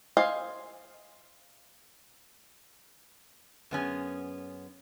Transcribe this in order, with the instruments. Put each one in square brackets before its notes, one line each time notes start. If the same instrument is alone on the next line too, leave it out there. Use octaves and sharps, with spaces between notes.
[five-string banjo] C5 D#5 F5 G#5
[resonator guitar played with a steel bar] F#2 B3 C#4 G#4